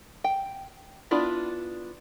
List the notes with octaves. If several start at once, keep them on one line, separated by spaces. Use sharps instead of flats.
G5
B3 D4 E4 F4